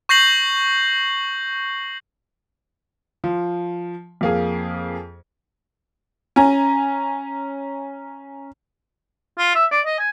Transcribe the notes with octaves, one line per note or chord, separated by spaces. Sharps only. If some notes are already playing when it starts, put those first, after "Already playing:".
C#6 G6 A#6 C7 F#7
F3
F2 A#3 G#4
C#4 G#5 A#5
F4
E5
D5
D#5
G#5